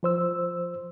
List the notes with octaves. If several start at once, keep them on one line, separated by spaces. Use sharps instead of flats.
F3 C5 E6